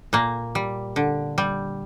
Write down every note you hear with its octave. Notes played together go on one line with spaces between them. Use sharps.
A#2 A#3
G3
D3
G3